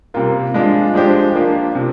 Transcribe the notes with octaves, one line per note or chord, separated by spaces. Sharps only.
C3 G3 A#3 F4 A#4
F3 G#3 D4 F4
F3 G#3 D4 G4 C5
F3 A#3 D4 F4
C3 F3